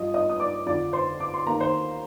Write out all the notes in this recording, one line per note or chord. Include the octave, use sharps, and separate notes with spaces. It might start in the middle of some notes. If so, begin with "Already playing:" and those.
Already playing: G2 F3 D#5 D#6
D#5 D#6
D#6
D5 D6
F2 D3 F3 D5 D6
C5 C6
D6
C6
D#2 D#3 A#5
C5 C6